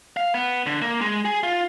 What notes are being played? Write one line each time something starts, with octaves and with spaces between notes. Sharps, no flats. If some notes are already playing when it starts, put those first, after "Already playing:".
F5
B3
D3
A#3
G#3
G#4
F4